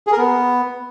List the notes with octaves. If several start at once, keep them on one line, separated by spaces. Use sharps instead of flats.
G#4
A#4
B3